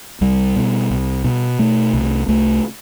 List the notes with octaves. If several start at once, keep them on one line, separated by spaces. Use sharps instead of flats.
C2 G3
B2
C2
B2
B2 A3
C2
C2 A3